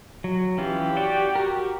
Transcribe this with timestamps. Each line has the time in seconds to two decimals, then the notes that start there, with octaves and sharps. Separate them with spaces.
0.24 F#3
0.58 E3 C#4 F4 G4
0.97 F#4 D5 G5
1.35 F#4 A#4